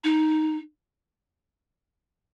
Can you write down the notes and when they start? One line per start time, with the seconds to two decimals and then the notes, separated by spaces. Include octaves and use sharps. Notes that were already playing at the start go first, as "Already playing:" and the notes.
0.04 D#4